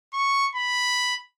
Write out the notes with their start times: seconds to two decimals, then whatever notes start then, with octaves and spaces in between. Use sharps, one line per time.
0.14 C#6
0.55 B5